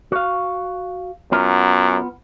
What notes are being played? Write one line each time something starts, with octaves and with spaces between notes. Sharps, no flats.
F#4 F5
F#2 B3 F4 A#5